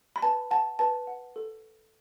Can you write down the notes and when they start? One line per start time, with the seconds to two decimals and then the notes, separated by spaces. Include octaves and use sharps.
0.16 B5
0.22 B4 A5
0.51 F#5 A5
0.79 B4 A5
1.07 F#5
1.36 A4